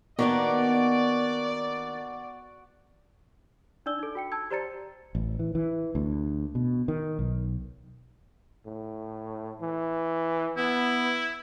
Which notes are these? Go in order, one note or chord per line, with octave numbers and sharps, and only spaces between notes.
D#3 A#3 B3 D4 F#4 D5
D4 D#4 D5 E6 G7
D#4 A4
F#4 G5 C#7
A5 E6 G#6
G4 C5 D5 A#5 A6 C#7
A1
E3
E3
D2
B2
D#3
B1
A2
E3
B3 E4